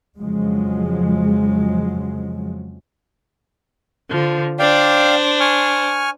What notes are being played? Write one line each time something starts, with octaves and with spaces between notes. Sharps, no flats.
F2 C#3 F3 F#3 G#3
D3 F3
D4 C5 D5 F5 G5
G#5 C#6 F6